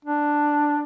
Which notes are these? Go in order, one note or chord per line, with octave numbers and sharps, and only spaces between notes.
D4